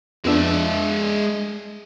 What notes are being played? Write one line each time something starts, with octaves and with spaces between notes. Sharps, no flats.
F2 G#3 B3 D4 E5